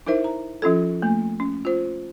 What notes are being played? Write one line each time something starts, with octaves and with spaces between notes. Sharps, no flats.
D#4 E4 A#4 C5 E5
A#5
F3 C#4 F4 A4
A3 A#3
C#4
F4 C5